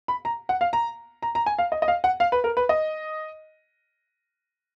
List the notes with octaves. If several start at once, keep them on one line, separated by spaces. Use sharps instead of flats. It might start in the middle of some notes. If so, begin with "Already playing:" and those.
B5
A#5
F#5
F5
A#5
A#5
A#5
G#5
F5
D#5
D#5
F5
F#5
F5
B4
A#4
B4
D#5